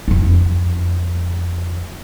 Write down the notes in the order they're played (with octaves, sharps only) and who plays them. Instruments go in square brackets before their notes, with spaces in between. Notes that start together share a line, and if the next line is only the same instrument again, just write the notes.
[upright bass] F2 E4